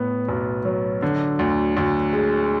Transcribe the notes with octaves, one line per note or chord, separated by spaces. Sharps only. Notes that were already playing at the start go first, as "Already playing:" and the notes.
Already playing: A2 B3
B1
F#3
D3
D2
D2
G#3